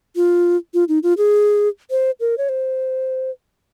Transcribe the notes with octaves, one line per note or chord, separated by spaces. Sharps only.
F4
F4
D#4
F4
G#4
C5
A#4
C#5
C5